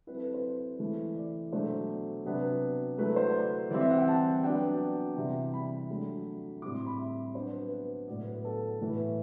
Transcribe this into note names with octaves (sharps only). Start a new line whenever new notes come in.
F#3 C4 E4 B4
A4
B4
C5
E3 A3 E4
D5
B2 F#3 A3 D4 C5
C3 F#3 B3 D4
F#3 A3 E4 B4
C5
D5
E3 G3 C4 E4 D5
E5
F#5
G5
A5
F#3 B3 D4 G5
C3 E3 G3
B5
F#3 A3 D4
A2 G3 C4 E4 D6
C6
B5
E5
F#3 B3 D4 C5
B4
B4
A2 F#3 B3 D5
B4
A4
A2 E3 A3 E4 B4